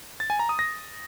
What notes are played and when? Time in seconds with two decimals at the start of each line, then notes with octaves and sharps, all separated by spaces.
0.20 A6
0.30 G#5
0.39 A#5
0.49 D#6
0.59 A#6